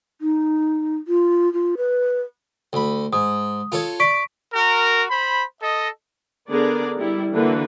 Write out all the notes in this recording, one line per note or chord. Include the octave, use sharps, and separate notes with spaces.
D#4
F4
F4
B4
D2 B5
G#2 D#6
F4 A4 C#5
D5 C#6 B6 D7
F#4 A#4
C5 B5
A4 D#5
D3 B3 D4 G#4 A#4 D5
G3 E4
D3 E3 A#3 D4 F#4 B4